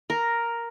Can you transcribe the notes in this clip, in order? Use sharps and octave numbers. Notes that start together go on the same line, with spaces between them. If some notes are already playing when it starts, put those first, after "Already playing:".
A#4